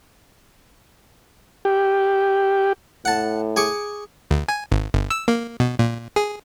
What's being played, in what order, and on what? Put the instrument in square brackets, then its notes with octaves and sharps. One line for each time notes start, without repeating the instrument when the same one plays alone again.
[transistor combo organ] G4
[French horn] A2 [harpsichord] F#5 A5
[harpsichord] G#4 C#6 D6
[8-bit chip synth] D2
G#5
G#1
G1
E6
A#3
B2
A#2
G#4